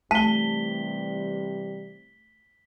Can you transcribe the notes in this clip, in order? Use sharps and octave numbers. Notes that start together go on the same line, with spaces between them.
C3 E3 G3 A3 A5 B6 G7